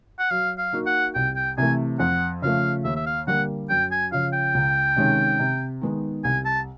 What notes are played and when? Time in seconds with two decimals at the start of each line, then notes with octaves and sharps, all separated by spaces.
0.19 F#5
0.31 F#3 F5
0.58 F5
0.73 A#3 D#4 F#4
0.86 F#5
1.15 C2 G5
1.36 G5
1.58 C3 E3 A3 G#5
1.99 F2 F#5
2.42 C#3 F3 A3 F5
2.84 D#2 E5
2.96 E5
3.06 F5
3.27 D3 G3 A#3 F#5
3.69 F#2 G5
3.91 G#5
4.12 C#3 F3 F5
4.33 G5
4.54 C#2
4.96 C3 D#3 G#3 C#4
5.40 C3
5.81 D#3 G#3 B3 D#4
6.24 C2 G#5
6.45 A5